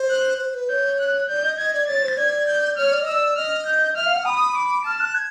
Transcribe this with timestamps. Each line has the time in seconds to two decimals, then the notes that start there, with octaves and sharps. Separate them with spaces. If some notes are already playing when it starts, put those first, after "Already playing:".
Already playing: C5
0.10 F#6
0.39 C5
0.54 B4
0.69 C#5 G6
0.99 F#6
1.29 D5 G6
1.44 D#5
1.58 D#5 G#6
1.74 D5
1.88 C#5 A6
2.03 C5
2.17 D5 G#6
2.48 G6
2.78 C#5 F6
2.92 D5
3.01 D#5
3.07 D5 E6
3.36 D#5 F6
3.67 G6
3.96 E5 F6
4.06 F5
4.15 F#5
4.25 B5 D#6
4.55 D6
4.85 A5 F6
5.00 F#6
5.15 G#6